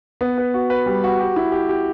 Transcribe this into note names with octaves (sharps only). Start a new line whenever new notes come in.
B3
B4
F#4
B4
G3
F#4
G4
E4
G4
G4